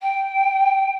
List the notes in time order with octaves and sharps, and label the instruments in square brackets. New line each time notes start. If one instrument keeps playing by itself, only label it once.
[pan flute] G5